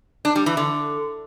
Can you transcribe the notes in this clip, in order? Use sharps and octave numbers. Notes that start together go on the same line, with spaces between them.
D4
G3
E3
D3